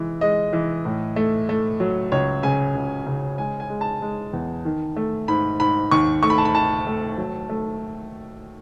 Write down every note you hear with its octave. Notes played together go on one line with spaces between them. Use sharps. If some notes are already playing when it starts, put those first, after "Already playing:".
Already playing: E3 G#3
G#3 D#5
E3
A2
A3
A3
F#3
C#2 C#5
C#3 G#5
C#2
C#3
G#3 G#5
G#5
G#3
A5
G#3
E2
D#3
A3
G#2 B5
G#2 B5
D#2 C#6
A3 C#6
B5
A5
B5
D#3 A5
A3
F#3
A3